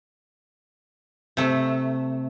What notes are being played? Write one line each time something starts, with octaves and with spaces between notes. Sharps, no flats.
C3 A3